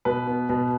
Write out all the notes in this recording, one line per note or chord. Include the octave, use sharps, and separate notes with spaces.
B2 B4
B3
B2